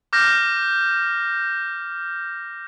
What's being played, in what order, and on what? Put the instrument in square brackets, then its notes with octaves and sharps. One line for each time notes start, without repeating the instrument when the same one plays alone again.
[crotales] D6 F6 G6 A#6